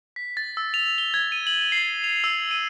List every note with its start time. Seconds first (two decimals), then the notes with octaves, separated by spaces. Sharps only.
0.16 B6
0.37 A6
0.57 E6
0.74 F7
0.98 G7
1.14 G#6
1.32 D#7
1.47 F#7
1.72 C7
2.04 F7
2.24 E6
2.51 D#7